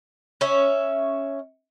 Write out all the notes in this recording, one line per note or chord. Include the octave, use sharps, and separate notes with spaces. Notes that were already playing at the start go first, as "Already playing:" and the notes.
C#4 C#5 E5